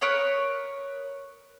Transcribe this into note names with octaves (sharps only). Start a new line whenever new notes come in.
A#4 B4 C#5 D#6